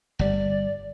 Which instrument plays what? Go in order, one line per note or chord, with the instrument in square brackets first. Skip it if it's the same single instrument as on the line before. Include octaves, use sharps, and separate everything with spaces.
[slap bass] G1 G3 [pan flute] D5